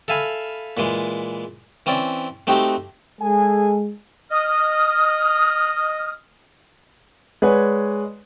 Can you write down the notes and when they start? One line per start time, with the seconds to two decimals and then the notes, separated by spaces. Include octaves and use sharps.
0.08 A4 E5 F5 G#5 B5
0.77 A#2 E3 G#3
1.86 E3 C4 C#4 D5
2.47 A3 C4 D#4 F#4 G4
3.21 G#3 G#4 A4 G#5
4.32 D#5 D#6 F6
7.42 G#3 B4 C#5 D5 F#5 G#5